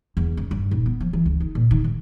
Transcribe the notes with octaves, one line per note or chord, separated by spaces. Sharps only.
E2
C#3
G2
D#1
B3
F3
E3
C#2
D#3
A#2
D#3
G#2